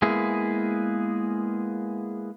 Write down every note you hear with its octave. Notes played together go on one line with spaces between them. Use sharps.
G#3 A#3 B3 E4 G#4